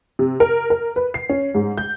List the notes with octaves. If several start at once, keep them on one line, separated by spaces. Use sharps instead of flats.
C3
A#4
A#4
B4
C7
C#4
G#2
G6